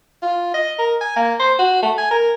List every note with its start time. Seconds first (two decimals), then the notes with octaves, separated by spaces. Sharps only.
0.22 F4
0.54 D#5
0.79 A#4
1.01 G#5
1.16 A#3
1.39 C5
1.59 F#4
1.82 A3
1.98 G#5
2.11 A#4